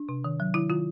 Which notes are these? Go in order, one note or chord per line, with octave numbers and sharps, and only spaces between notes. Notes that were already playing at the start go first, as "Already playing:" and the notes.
Already playing: D4
C3
D#3
F#3
D#3 E4
D#3 F4